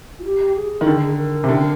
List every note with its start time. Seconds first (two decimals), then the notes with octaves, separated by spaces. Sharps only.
0.19 F4
0.25 G4
0.55 G#4
0.81 D#3
0.87 D3
1.17 A#4
1.33 A#4
1.44 C3
1.49 D3